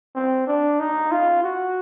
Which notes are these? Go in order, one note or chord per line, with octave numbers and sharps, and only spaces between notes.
C4
D4
D#4
F4
F#4